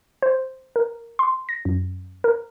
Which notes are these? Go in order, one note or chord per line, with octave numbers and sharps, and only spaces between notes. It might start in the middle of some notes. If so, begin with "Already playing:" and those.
C5
A#4
C6
A#6
F#2
A#4